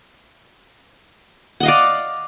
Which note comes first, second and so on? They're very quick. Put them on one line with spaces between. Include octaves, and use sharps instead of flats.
F#5 D#5 F5 D5